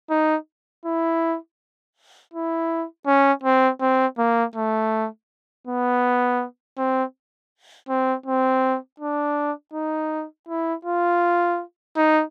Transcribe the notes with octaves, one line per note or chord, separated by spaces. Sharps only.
D#4
E4
E4
C#4
C4
C4
A#3
A3
B3
C4
C4
C4
D4
D#4
E4
F4
D#4